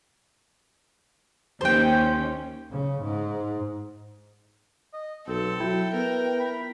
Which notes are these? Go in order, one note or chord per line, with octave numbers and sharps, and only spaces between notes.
D#2 C#4 C5 G5
C#3
G#2
D#5
B1 C4 A4
F#3 E4 G5
B3 A#4
B5